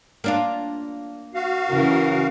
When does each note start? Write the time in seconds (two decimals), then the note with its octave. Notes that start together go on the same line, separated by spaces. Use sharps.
0.24 A#3 D4 F4
1.34 F#4 F5
1.69 C#3 E3 A#4